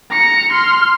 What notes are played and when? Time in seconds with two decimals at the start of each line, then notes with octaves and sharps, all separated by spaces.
0.11 A#5 C#7
0.52 C6 F6